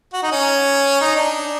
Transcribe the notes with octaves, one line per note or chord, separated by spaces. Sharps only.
F#4
D#4
C#4
D#4
D4